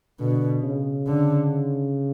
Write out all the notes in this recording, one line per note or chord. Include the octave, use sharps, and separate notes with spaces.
B2 D3
C#3
D3